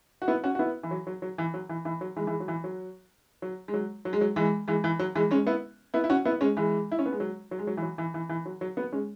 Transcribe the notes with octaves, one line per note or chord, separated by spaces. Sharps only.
F#4
B3 E4
C#4 F#4
F#4
B3 E4
E3
F#3
F#3
F#3
E3
F#3
E3
E3
F#3
E3 G#3
E3 G#3
F#3
E3
F#3
F#3
G#3
F#3
F#3
G#3
F#3
E3 G#3
E3 G#3
E3
F#3
E3 G#3
G#3 C#4
B3 E4
B3 E4
E4
C#4 F#4
B3 E4
G#3 C#4
E3 G#3
E4
C#4
B3
G#3
F#3
F#3
G#3
F#3
E3
F#3
E3
E3
E3
F#3
F#3
F#3 B3
G#3 C#4